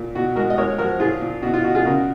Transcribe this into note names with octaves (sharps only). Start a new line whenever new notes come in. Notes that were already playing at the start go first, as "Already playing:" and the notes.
Already playing: A#2
B2 F#4
G#3 F#4 A#4
D#5
G#3 A#4 C#5
F3 F#4 A#4
A#2 F4 G#4
A#2
B2 F#4
F4
B2 F#4
F4 G#4
C#3 F#4 A#4